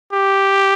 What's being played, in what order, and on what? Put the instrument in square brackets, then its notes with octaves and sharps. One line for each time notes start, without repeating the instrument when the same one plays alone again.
[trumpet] G4